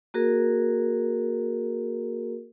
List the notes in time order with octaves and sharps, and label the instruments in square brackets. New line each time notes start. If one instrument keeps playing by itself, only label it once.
[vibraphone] A#3 F#4 G#4 A#4